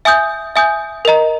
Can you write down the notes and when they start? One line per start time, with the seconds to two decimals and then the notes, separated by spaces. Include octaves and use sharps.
0.05 E5 G#5 D#6 G6
0.56 E5 G#5 D#6 G6
1.05 A#4 D#5 A#5